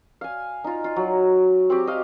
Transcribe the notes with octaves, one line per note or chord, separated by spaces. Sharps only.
F5 G#5
D#4 F4
F4
F#3
C4 F#4 G4
D#5 F5 D6